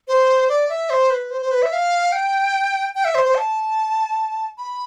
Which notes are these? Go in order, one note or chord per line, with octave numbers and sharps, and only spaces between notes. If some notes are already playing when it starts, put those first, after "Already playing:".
C5
D5
E5
C5
B4
C5
C5
B4
E5
F5
G5
G5
E5
C5
C5
A5
B5